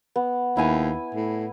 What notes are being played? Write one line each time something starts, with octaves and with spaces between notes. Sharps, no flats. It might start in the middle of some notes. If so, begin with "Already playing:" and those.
B3
D#2 E4 G#5
A2